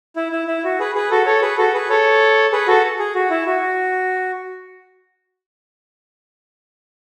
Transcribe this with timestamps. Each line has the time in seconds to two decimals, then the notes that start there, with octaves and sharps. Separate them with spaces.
0.16 E4
0.32 E4
0.48 E4
0.64 F#4
0.80 G#4 B4
0.95 G#4 B4
1.11 F#4 A4
1.26 A4 C#5
1.42 G#4 B4
1.58 F#4 A4
1.74 G#4 B4
1.90 A4 C#5
2.52 G#4 B4
2.67 F#4 A4
2.99 G#4
3.15 F#4
3.30 E4
3.47 F#4